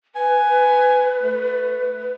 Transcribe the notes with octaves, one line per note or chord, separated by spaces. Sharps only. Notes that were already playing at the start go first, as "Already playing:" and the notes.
B4 G#5
A3